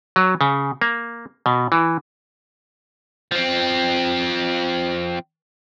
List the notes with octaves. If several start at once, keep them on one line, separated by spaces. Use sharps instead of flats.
F#3
C#3
A#3
B2
E3
F3 C4